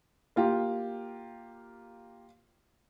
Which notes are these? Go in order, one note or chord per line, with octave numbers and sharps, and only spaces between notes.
A#3 F4 G4